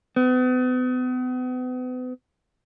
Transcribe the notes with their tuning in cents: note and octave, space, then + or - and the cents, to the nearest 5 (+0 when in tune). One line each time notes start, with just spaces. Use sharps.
B3 +40